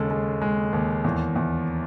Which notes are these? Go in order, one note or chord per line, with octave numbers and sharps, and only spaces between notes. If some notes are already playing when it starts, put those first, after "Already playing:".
Already playing: D#2 C#3 G#3 A4
G#3
G#3
D#2
E2
E2